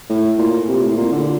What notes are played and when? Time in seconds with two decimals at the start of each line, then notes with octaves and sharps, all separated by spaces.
0.10 A2
0.38 A#2
0.68 C3
0.83 A2
0.97 A#2
1.12 D3